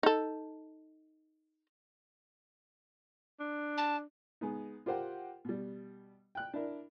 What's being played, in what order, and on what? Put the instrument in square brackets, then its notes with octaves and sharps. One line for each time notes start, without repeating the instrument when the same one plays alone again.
[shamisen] D#4 A4
[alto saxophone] D4
[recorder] A5
[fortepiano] G#3 B3 D#4
F4 G4 A#4 C5 F#5 G5
B2 G3
G5 F#6
D4 E4 A#4